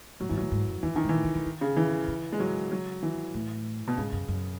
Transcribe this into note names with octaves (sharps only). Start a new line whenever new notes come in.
A2 F#3
G#2 E3
A2 F#3
G#2
F#2
E2 E3
F#2
D#3
G#2
E3
A2
C#3
E3
D#3
C#3
E3
C#3
G#3
F#3
F#3
E3
A2
B2
G#2 C#3
F#2
F#2